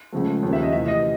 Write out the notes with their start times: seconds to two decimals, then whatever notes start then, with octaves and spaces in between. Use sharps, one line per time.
0.12 C#2 C#3 F3 A3
0.43 D#2 C#3 F3 A#3
0.53 E5
0.63 D#5
0.73 D2 C3 E3 E5
0.88 D#5